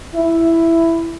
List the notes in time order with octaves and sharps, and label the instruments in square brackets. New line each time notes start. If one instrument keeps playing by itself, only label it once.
[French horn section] E4